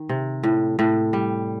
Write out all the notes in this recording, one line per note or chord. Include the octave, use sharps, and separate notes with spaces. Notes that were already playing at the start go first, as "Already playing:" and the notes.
Already playing: D#3
C3
A2
A2
G3